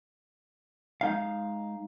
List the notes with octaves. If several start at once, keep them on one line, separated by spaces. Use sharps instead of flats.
G#3 D#4 F5